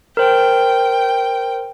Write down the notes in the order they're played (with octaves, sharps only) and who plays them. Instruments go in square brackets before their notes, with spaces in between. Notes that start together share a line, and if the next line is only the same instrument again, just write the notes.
[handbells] A#4 C5 [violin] G5